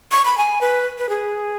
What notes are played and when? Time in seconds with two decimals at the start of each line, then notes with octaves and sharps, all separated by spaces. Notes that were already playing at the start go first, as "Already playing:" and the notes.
0.12 C#6
0.25 B5
0.38 G#5
0.61 B4
0.98 B4
1.09 G#4